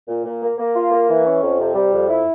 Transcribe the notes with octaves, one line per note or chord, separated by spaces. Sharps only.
A#2
A#2
A#3
A#3
F4
A#3
E3
C#4
F2
C3
G3
F2
E4